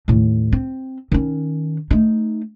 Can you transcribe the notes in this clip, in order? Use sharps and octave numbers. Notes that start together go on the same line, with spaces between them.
D#2 A2
C4
D#3 C#4
A3 D#4